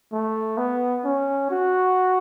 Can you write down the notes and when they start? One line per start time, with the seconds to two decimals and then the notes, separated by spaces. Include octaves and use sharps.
0.13 A3
0.58 B3
1.05 C#4
1.51 F#4